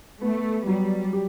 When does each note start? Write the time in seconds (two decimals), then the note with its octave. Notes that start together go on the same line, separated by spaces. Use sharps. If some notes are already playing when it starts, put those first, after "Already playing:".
0.21 A3 B3
0.67 F#3 G3
1.13 G4